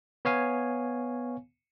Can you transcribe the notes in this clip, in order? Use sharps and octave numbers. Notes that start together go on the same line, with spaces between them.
B3 C#5 F5 G#5